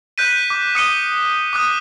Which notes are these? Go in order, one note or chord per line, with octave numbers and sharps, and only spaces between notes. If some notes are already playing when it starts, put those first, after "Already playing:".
F#6 G6 B6 D#7
D6
D#6 C#7 D#7 G7
D6 D#6 F#6